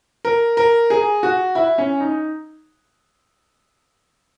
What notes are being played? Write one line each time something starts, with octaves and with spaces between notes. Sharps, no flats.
A#4
A#4
G#4
F#4
E4
C#4
D#4